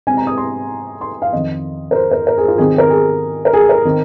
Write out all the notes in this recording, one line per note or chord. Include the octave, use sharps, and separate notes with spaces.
C3 G#3 C4 G#5
A#5
D#6
C6
C6
F5
F2 D#3 C4 D#5
A#4
C5
A#4
A#4
G#4
F4
C3 D#3 C4 G#4
A#4
G#4
A#4
G#4
A#4
D#3 C4